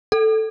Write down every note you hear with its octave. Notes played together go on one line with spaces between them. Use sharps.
A4